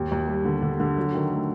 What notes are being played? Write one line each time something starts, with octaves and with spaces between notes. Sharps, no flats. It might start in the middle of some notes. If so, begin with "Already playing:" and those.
Already playing: D#2
D#2
G3
D3
D3
D3
F#3
D#3
A3